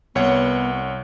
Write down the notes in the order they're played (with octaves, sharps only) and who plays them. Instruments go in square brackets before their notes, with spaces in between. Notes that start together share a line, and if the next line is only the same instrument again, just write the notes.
[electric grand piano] C2 C#5 F#5 [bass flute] B3